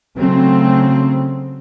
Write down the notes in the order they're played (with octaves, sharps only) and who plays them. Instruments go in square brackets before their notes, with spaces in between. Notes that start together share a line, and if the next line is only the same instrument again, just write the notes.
[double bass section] C#3 F#3 A3 C4